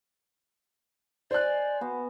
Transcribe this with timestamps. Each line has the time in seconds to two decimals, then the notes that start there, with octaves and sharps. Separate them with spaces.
1.31 C5 D5 D#5 G#5 F#6
1.81 B3 F#4